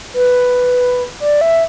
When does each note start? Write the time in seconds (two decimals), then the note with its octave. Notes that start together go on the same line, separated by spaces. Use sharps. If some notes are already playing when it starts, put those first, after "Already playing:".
0.14 B4
1.20 D5
1.41 E5